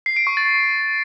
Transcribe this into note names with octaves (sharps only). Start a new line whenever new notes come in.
C7
D7
C#6
A6